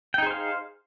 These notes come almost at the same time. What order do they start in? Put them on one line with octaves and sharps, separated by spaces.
G5 D#4 G#4 C5 F5